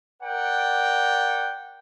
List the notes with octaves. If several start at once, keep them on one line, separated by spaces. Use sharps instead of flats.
A#4 D5 F#5 G5